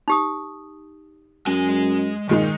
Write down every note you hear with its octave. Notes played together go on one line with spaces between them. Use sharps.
D#4 G4 D#6
F#2 G#3 G#5
A#2 D#3 G#3 D#4